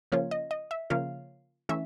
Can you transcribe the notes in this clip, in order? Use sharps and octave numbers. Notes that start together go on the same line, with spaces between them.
C#3 F3 A#3 C#4 F4 C#5
D#5
D#5
E5
C#3 F3 A#3 C#4 F4 F5
E3 A3 C#4 E5